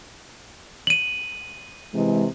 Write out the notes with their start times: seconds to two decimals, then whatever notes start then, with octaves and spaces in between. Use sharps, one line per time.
0.87 D#7 F#7
1.94 C3 E3 G#3